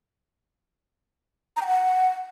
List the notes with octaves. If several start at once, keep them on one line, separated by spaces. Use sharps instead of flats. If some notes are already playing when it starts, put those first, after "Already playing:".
A#5
G5
F#5